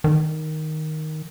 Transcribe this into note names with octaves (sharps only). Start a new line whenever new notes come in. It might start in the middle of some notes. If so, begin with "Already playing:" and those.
D#3